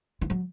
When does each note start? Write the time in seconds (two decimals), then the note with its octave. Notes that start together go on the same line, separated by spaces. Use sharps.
0.21 E3
0.30 F#3